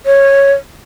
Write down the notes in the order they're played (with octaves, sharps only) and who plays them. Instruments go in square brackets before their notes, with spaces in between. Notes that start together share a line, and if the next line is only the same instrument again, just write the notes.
[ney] C#5